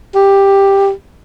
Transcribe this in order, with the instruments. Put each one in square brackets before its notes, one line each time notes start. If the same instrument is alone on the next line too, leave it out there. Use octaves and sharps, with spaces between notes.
[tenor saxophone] G4